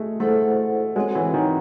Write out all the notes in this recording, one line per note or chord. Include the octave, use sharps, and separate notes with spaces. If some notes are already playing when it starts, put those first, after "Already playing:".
Already playing: G#3 A3
A3 E4 A4 C5 F#5
G#3 C4 F#4 C#5 F#5
E3
D#3